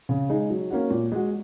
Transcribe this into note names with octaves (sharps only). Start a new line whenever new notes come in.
C#3
G#3 D#4 G#4
F#3
A#3 C#4 F#4
A#2
G#3 F#4